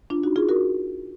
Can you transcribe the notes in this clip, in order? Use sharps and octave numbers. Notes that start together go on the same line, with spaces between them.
D4 F4
D#4 F#4
F4 G#4
F#4 A#4